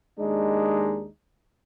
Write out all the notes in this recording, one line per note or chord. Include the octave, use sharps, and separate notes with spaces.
D#2 G#3 D4 D#4